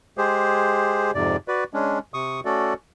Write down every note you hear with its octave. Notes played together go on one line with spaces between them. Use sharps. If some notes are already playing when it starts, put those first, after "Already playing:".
G#3 G4 G#4 C5
F2 G#2 C3 D5
F#4 B4 D5
G#3 C#4 D4
C3 C#6 D#6
A3 C#4 F#4 A4 D5